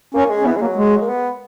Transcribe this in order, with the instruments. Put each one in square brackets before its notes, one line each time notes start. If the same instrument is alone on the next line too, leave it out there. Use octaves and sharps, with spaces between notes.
[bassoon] A#3 [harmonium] C#4
[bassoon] G#3
[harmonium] C#4
[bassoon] E3 [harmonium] B3
[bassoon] G#3
[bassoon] F#3 [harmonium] A#3
[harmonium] G#3
[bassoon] A#3
B3